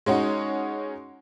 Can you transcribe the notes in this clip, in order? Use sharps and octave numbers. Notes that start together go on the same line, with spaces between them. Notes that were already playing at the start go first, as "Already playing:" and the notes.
G#3 C#4 D#4 F#4